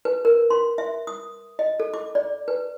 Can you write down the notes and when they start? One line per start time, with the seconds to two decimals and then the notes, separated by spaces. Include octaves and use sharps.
0.05 B4
0.25 A#4
0.50 C6
0.78 E5
1.07 D#6
1.59 D#5
1.80 A4
1.94 D6
2.15 D5
2.48 B4